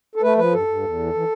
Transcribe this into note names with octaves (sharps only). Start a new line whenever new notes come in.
A4
A3 B4
F3 B4
G2 A4
G2
E2
E3
E3